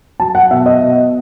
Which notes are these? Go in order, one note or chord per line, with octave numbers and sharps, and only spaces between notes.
F#3 A5
F#5
B2 E5
D#5
B2